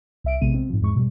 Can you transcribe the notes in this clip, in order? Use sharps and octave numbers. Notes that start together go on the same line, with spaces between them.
C2 E5 D7
A#1 C3 G#3 B3 D#7
C4
G#2 F3
E2 G#2 G#3 C#6
B2 G3